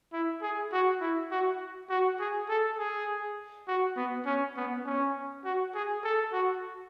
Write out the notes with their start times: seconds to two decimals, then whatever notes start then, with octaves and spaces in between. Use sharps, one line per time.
0.13 E4
0.42 G#4
0.73 F#4
1.01 E4
1.31 F#4
1.90 F#4
2.20 G#4
2.49 A4
2.78 G#4
3.68 F#4
3.97 B3
4.26 C#4
4.57 B3
4.86 C#4
5.44 F#4
5.75 G#4
6.04 A4
6.33 F#4